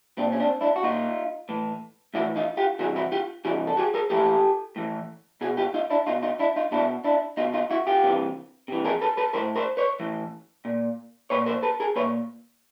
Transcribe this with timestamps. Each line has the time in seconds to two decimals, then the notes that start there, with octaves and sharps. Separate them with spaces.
0.17 A#2 C4 D4
0.32 C#4
0.40 C4 D4
0.61 D4 E4
0.76 F#4
0.83 A#2 D#4 F4
1.49 A2 E3
2.14 A2 E3 E4 F#4
2.36 D#4 F4
2.57 F4 G4
2.79 C3 E3 F#4 G#4
2.96 E4 F#4
3.12 F4 G4
3.45 C3 E3 F#4 G#4
3.67 A4
3.77 F#4 G#4
3.94 G#4 A#4
4.10 A2 E3 G4 A4
4.76 A2 E3
5.41 B2 F#4 G#4
5.57 F4 G4
5.74 D#4 F4
5.90 D4 E4
6.07 B2 D#4 F4
6.23 D#4 F4
6.40 D4 E4
6.56 D#4 F4
6.72 B2 D4 E4
7.04 D4 E4
7.37 B2 D#4 F4
7.54 D#4 F4
7.71 E4 F#4
7.87 F4 G4
8.04 C3 E3
8.68 C3 E3
8.85 G#4 A#4
9.01 A4 B4
9.17 A4 B4
9.33 E3 A#4 C5
9.37 A2
9.55 A#4 C5
9.77 B4 C#5
10.00 A2 E3
10.65 A#2
11.30 A#2 B4 C#5
11.46 A#4 C5
11.63 A4 B4
11.80 G#4 A#4
11.96 A#2 B4 C#5